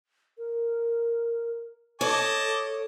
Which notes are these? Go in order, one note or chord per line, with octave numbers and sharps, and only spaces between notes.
A#4
A4 C#5 D#5 A5 D6